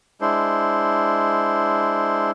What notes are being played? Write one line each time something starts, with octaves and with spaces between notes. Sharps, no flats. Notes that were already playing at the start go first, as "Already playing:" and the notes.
G#3 D4 E4 C5